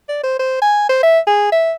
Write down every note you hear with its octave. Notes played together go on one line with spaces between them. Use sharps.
D5
C5
C5
G#5
C5
E5
G#4
E5